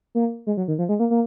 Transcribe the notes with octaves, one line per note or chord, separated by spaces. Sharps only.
A#3
G#3
F#3
D#3
F3
G#3
A#3
A#3